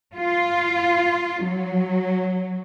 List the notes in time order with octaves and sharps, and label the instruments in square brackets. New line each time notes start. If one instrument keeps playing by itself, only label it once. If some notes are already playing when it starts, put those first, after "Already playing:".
[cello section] F4
F#3